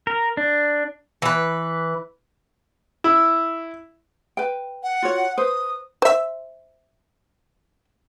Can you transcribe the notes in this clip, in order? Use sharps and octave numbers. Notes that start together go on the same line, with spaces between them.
A#4
D4
E3 B4
E4
B4 G5
F#5
F4 F#4 C#5
B4 C5 D#6
C5 E5